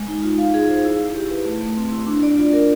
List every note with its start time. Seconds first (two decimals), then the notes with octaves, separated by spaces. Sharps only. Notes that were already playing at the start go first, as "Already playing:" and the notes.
Already playing: G#3
0.08 D#4
0.23 F4
0.38 F5
0.54 G#4
0.69 C5
0.85 E4
1.00 E4
1.15 G4
1.30 B4
1.45 A3
1.61 A3
1.77 C4
1.92 E4
2.06 D4
2.23 D5
2.37 F4
2.53 A#4